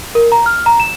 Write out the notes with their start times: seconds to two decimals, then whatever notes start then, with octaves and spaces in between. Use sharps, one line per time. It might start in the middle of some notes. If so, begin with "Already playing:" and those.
0.15 A#4
0.32 A#5
0.46 F6
0.66 A#5
0.80 E7